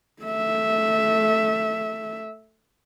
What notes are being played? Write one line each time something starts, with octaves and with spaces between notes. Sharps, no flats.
A3 E5